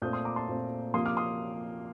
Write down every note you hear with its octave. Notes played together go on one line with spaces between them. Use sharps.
A#2 A3 C4 D#6 G6
C6 D#6
A#5 D6
A5 C6
A#2 A3 C4
C3 F3 A#3 C6 D#6
D6 F6
C6 D#6